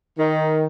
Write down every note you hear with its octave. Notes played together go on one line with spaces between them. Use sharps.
D#3